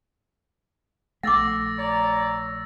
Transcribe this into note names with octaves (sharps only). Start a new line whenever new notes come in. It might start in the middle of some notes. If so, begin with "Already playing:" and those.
A#1 A3 F#5 D6 E6 A6 A#6
C#5 D5 A#5